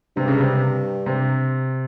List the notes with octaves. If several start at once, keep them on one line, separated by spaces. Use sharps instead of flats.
G2 C3
C#3
C3
C3